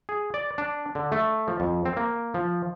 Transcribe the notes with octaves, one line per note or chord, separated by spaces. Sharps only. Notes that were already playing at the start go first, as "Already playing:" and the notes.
G#4
D5
D4
D3
A3
F3
F2
C4
A#3
F3